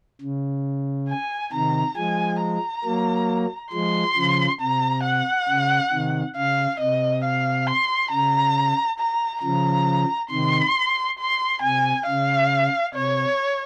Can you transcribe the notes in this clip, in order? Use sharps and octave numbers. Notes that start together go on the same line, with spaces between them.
C#3
G#5
C3 D#3 A#5
F3 G#3 G#5
A#5
F#3 A#3
F3 G#3 C6
C#3 F3
C3 A#5
F#5
C#3
C3 D#3
C#3 F5
C3 D#5
F5
C6
C#3 A#5
A#5
C#3 F3 A#5
C3 D#3 C6
C6
C3 G#5
C#3 F5
C3 C#5